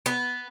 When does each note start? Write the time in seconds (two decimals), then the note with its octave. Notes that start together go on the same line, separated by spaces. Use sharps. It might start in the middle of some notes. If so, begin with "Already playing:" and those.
0.06 B3